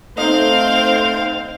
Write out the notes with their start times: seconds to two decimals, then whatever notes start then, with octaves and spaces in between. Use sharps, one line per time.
0.18 A3 C4 D#4 C5 F5